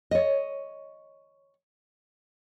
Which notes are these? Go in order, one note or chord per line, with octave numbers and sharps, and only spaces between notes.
C#5 D#5